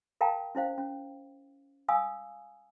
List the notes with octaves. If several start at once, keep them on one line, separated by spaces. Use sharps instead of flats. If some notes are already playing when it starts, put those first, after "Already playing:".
A#4 F5 G5 A5 A#5
C#4 E4 C5 F5
C#4
F5 G#5 D#6 E6